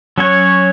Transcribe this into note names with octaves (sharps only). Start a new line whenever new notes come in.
F#3 C#4 F#4 C#5